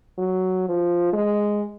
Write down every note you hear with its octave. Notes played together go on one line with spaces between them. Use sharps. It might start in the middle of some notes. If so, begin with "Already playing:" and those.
F#3
F3
G#3